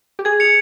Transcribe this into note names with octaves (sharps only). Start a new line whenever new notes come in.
G4
G#4 G#6
C#7 F7